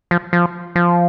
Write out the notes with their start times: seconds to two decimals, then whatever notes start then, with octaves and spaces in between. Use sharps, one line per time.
0.11 F3
0.33 F3
0.76 F3